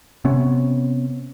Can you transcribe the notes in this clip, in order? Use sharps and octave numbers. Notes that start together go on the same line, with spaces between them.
C3 B3 C#4